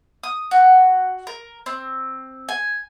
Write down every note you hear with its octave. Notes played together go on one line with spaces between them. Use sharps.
D#6
F#4
A#4
C4
G#5